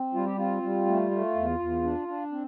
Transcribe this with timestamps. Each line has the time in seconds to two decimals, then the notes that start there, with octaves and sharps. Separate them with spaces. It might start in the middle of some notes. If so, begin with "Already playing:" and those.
Already playing: C4
0.14 G3 F4
0.25 G4
0.36 C4 F4
0.63 G3
0.86 A3
1.11 A3
1.35 E2
1.59 E2
1.83 D4
2.08 D4
2.32 C4